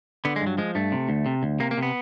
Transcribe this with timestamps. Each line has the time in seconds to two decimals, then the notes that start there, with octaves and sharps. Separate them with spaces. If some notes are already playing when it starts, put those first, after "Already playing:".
0.25 D3 B3
0.36 G#3
0.41 G2
0.47 F#3
0.58 F3 G#3
0.75 G2 A3
0.92 C3
1.09 D2
1.26 C3
1.43 D2
1.60 C3 A#3
1.71 A#3
1.78 C3
1.83 B3